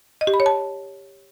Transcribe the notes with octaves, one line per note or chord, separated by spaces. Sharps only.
D#5
G4
B5
C#5
A5